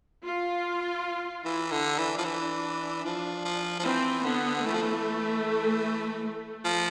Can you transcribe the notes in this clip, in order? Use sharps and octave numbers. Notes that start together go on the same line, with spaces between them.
F4
E3 E4
D3
D4
E3
F3
E3
F3
F3
F3
E3 C4
D3 B3
E3 A3
F3
E3
A3
F3